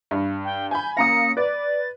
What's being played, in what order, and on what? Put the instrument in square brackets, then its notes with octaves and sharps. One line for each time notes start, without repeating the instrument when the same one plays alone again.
[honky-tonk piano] G2
[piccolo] G5
[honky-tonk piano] G#5 B5 [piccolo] G6
[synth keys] A#3 C#4 A#6 [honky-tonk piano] F5 A#5 D#6 [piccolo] C#7
[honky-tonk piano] B4 [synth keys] D5 [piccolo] A6